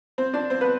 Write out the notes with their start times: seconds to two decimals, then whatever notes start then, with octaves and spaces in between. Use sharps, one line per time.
0.18 C4 C5
0.33 D4 D5
0.50 C4 C5
0.61 B3 B4